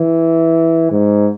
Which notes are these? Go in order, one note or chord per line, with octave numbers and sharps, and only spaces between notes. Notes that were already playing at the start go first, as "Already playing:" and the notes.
Already playing: E3
G#2